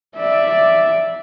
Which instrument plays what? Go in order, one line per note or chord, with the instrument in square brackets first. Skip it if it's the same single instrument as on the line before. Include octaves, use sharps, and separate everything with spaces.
[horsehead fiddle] D5 E5